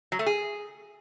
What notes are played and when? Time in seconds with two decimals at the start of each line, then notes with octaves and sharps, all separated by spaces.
0.12 F#3
0.19 A3
0.26 G#4